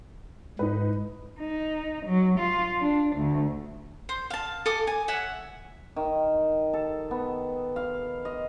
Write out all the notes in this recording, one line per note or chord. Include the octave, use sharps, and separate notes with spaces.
G#2 D#4 B4
D#4
F#3
F4
D4
D2
C5
F5 A5
A4 G#5 D6 D#6
G#5
C#5 E5 F#5 G#5
D#3
A4
B3
F5
D#5